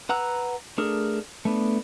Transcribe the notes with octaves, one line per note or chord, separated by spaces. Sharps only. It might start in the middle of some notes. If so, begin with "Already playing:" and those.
B4 F#5 A#5 E6 F#6
A3 D4 G#4 A#4
A3 B3 D4